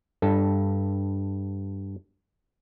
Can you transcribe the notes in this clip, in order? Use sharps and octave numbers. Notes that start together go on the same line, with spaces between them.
G2 A4